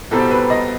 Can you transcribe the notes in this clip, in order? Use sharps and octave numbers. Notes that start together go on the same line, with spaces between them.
C2 B2 G3 C4 A4
B4
D#5